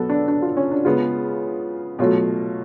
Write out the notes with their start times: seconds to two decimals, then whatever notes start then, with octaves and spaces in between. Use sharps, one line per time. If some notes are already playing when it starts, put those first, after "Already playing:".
Already playing: B2 F#3 B3 F#4 A4
0.10 D4
0.28 D4
0.42 F4
0.57 C#4
0.71 D4
0.85 C#3 G#3 B3 F4
1.99 B2 F#3 A3 F4